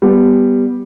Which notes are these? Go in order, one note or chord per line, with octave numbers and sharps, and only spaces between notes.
G3 B3